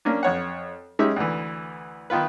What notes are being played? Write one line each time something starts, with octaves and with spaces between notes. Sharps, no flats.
A#3 C#4 D4
F2 C#5 F#5
G#3 C#4 D#4 G4 E5
D2 E3
D#3 B3 F4 B4